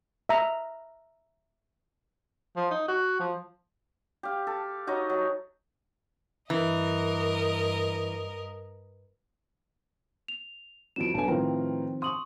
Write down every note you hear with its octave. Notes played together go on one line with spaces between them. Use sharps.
E5 A#5
F3
D#4
F#4
F3
G4 F5
A4
D#4 F#4 C#5 D#5
F#3
G2 E3 A#4 D#5
F7
F2 E3 F#3 D7 E7
B1 D4 B4 G#5 A5
A2 D#3 F3 C4 F4 A#4 B4 G5
C6 C#6 D#6 F#7